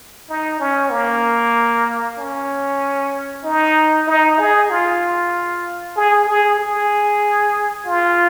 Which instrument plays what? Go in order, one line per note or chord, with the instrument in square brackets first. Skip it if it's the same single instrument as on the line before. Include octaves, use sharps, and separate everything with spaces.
[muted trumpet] D#4
C#4
A#3
C#4
D#4
D#4
G#4
F4
G#4
G#4
G#4
F4